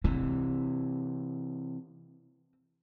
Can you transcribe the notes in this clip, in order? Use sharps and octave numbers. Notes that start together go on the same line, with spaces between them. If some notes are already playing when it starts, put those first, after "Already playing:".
C3 E3 C4